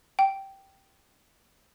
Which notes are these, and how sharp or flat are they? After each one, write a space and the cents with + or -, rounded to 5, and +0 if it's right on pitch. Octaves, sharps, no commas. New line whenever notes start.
G5 -10